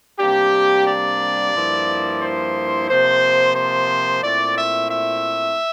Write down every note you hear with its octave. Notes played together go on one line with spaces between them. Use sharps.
C3 G3 A#3 D4 G4
D5
G2 F3 A#3 E4
C5
C3 F3 A#3 C5
C5
A#2 A3 C4 E4 D5
E5
E5